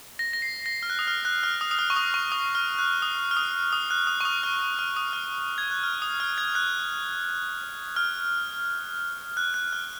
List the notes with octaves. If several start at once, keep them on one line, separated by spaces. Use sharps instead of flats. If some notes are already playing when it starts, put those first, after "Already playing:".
A#6
A#6
C7
A#6
F6
F#6
D#6
F6
F#6
F6
D#6
D#6
F6
C#6
D#6
C#6
D#6
F6
F#6
D#6
F6
D#6
D#6
F#6
D#6
C#6
D#6
F6
F6
D#6
F6
G#6
F#6
F6
D#6
F6
G#6
F#6
F6
F#6
F#6
F6